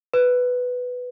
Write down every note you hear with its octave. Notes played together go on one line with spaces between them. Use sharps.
B4